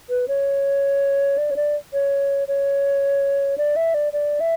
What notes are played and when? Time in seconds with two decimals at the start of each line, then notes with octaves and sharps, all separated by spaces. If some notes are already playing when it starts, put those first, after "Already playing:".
0.10 B4
0.28 C#5
1.38 D5
1.51 C#5
1.56 D5
1.93 C#5
2.48 C#5
3.58 D5
3.76 E5
3.94 D5
4.13 D5
4.40 E5